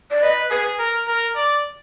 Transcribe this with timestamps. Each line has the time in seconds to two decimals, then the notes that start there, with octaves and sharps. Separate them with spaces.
0.11 D5
0.22 B4 D#5
0.51 G#4 B4
0.79 A#4
1.08 A#4
1.36 D5